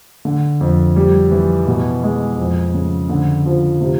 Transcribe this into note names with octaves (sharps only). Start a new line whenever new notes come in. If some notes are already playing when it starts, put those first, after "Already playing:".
D3
F2
G3
E3
B2
G#3
F2
C#3
D3
F3
C3